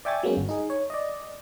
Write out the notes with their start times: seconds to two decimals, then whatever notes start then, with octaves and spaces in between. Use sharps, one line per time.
0.05 D5 E5 G5 G#5 C#6 A6
0.23 F#3 G#3 A#3 B3 C#4
0.37 G1
0.49 D#4 G#4
0.70 C#5
0.90 D5 D#5